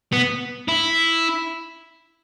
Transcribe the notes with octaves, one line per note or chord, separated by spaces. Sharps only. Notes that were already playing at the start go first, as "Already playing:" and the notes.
B3
E4